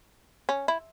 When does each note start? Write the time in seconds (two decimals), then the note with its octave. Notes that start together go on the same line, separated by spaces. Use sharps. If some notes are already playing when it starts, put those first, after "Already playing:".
0.49 C#4
0.68 E4